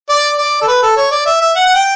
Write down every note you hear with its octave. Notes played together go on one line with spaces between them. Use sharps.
D5
D5
A4
B4
A4
C#5
D5
E5
E5
F#5
F#5
G5